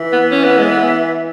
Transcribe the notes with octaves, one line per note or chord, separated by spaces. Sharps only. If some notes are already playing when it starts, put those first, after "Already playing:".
Already playing: E3
B3
C#4
B3
G#3
B3